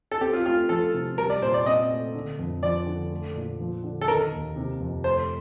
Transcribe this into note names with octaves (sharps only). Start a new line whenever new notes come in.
A4
C4 G4
F4
A3 F4
F3 A4
C3
G3 A#4
D5
A#2 C5
D5
C4 D#5
A3
D3
F2
F3 D5
D3
A3
A#2
F3
D3
A4
D#3 A#4
D#2
C3
F2
A3 C5